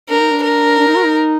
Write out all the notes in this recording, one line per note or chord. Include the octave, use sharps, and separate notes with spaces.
D4 A#4
D#4
D4
A#4
D4
D#4
F#4
D#4